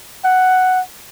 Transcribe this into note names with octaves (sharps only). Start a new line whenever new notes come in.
F#5